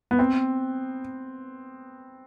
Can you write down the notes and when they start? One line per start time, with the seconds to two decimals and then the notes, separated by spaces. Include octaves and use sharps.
0.11 B3
0.19 C4